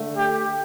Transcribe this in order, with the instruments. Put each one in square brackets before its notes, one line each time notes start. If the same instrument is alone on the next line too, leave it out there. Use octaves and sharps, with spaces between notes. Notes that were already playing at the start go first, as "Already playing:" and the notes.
Already playing: [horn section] D3 A3
G4